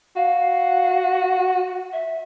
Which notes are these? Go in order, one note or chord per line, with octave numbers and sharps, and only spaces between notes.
F#4 F5
E5